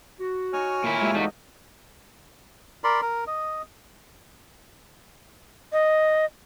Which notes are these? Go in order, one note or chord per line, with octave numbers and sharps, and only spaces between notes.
F#4
D#4 C#5 G#5 F6
A#2 D#3 E4
G#3 F4 G4 E5
E2 E3 A3 D#4 E4 F#4 D#5
A#4 D5 B5 C6
A#4
D#5
D#5